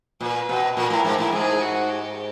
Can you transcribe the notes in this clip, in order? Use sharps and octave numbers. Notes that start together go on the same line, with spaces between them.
A#2 B4
B2
A#2 A#4
A2
G#2
A2
G#2 G#4
F#4
G4